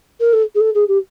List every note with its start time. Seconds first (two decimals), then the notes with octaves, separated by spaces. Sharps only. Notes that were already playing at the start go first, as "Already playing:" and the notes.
0.20 A#4
0.33 A4
0.55 G#4
0.60 A4
0.75 G#4
0.88 G4